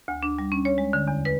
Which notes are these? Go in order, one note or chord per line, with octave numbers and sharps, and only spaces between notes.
D2
D4
G3
C#4
C#5
G#3
D3
E2
B4